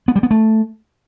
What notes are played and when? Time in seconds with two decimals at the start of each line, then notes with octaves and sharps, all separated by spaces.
0.08 B3
0.16 G3
0.23 B3
0.31 A3